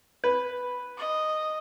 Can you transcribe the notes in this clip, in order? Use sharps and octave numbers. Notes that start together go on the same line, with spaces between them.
B4
D#5